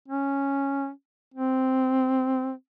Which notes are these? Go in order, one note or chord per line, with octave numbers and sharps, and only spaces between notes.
C#4
C4